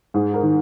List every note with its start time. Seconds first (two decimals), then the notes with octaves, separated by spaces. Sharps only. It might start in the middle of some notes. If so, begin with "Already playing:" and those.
0.14 G#2 G#4
0.34 A#4
0.43 D#3